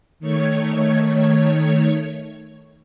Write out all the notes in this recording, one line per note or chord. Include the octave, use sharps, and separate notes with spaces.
D#3 A3 C#5 G#6